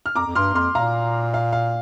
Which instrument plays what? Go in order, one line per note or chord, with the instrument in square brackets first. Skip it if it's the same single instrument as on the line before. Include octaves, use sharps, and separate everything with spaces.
[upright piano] F6
[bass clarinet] F2 [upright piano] A#5 D6
[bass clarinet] F2
[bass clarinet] G2 [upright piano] C6 F6
[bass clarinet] F2 [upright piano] C6 F6
[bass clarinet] A#2 [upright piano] F5 A#5
[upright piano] F5
F5